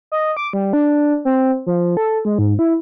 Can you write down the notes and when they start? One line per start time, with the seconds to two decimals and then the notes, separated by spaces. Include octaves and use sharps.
0.12 D#5
0.37 D6
0.53 G3
0.73 D4
1.25 C4
1.66 F3
1.97 A4
2.25 G#3
2.39 G#2
2.59 E4